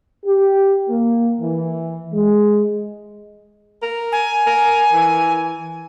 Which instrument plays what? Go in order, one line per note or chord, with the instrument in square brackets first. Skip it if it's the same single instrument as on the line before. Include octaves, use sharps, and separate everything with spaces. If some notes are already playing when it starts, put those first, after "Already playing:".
[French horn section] G4
A#3
E3
G#3
[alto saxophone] A#4
[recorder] G#5
[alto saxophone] A#4
E3